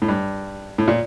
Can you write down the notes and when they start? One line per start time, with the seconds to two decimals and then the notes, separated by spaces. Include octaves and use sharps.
0.02 A2
0.08 G2
0.78 A2
0.88 A#2